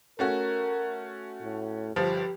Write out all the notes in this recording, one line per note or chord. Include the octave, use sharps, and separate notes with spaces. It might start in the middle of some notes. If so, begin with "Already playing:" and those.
A3 C#4 F#4 A#4
A2
G1 F3 G4